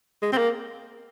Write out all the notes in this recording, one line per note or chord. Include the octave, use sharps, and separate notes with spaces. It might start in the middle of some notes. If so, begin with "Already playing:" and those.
G#3
C4
A#3